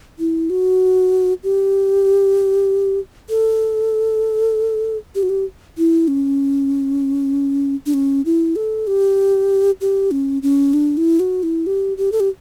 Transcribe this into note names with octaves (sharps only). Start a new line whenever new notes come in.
E4
F#4
G4
A4
G4
F#4
G4
E4
C#4
D4
C#4
E4
A4
G4
G4
C#4
C#4
D4
E4
F#4
E4
G4
G4
A4
G4